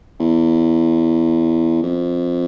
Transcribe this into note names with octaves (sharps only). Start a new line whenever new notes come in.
E2
F2